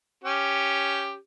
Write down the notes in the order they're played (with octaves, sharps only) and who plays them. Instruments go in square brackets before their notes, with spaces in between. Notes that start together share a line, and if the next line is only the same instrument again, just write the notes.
[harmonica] C#4 G4